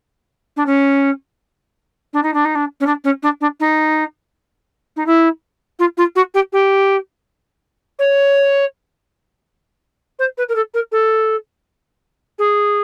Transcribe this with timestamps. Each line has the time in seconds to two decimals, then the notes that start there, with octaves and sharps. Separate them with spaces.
0.56 D4
0.66 C#4
2.13 D4
2.23 D#4
2.33 D4
2.45 D#4
2.55 D4
2.80 C#4
2.86 D4
3.04 C#4
3.22 D4
3.41 D4
3.60 D#4
4.96 D#4
5.06 E4
5.79 F4
5.97 F4
6.15 F#4
6.34 G4
6.52 G4
7.99 C#5
10.19 C5
10.37 B4
10.48 A#4
10.55 A4
10.74 A#4
10.91 A4
12.38 G#4